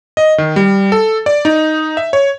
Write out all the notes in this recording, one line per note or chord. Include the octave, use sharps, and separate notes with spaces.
D#5
D#3
G3
A4
D5
D#4
E5
C#5